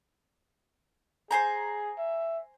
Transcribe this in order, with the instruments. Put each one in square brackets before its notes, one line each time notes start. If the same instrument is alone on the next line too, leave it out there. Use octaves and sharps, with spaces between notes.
[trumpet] G#4 [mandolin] C5 G#5 A#5
[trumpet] E5